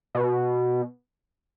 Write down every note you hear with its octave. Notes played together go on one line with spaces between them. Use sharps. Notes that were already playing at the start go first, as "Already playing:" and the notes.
B2